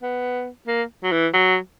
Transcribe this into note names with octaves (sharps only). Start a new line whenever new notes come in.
B3
A#3
F#3
E3
F#3